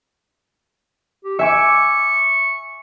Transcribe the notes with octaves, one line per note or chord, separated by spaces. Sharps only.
G4
E5 G#5 C#6 D6